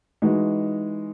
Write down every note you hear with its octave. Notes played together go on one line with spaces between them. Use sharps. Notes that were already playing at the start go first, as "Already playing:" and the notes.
E3 G#3 D#4 F#4